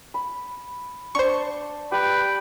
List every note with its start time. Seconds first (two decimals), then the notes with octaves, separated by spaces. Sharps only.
0.14 B5
1.15 D4 C5 G5 A5 C#6
1.92 G4 B4 G5 B5